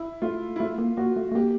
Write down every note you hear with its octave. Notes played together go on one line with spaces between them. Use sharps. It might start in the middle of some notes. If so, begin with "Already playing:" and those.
Already playing: E4
A3 F4
E4
A3 F4
A#3
A#3 F#4
A3
A3
A#3 G4